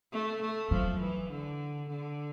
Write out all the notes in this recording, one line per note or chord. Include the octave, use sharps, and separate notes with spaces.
A3
A3
F3 F#3
E3
D3
D3